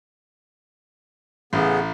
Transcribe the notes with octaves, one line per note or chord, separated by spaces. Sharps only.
A1 C#3 B3